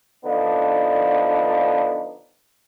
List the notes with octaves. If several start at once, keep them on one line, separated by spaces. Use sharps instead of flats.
D3 F3 B3 D4 D#4